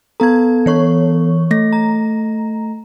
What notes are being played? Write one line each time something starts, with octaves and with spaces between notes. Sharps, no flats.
B3 A4 A#5 G#6
E3 C#5 C#6
A3 A#6
A#5